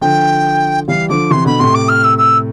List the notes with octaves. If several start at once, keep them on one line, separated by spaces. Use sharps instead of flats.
D3 F3 G5
E3 G3 F5
D3 F3 D6
C3 E3 C6
B2 D3 B5
A2 C3 C6
D6
F6
E6
E6